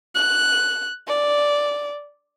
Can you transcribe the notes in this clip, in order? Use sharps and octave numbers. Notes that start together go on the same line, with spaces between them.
F#6
D5